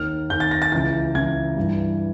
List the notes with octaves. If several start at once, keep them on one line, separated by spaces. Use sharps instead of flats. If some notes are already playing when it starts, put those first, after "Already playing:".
Already playing: D#2 D#3 F6
D#2 D#3 G6
A6
A#6
A6
C#2 C#3 E3 A6
C#2 C#3 E3 G#6
G2 E3